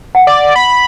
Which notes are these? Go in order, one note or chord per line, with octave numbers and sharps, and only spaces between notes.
F#5
D5
B5